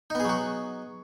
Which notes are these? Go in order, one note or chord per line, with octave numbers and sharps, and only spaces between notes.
F#3 B3 D#4 F#4 G#4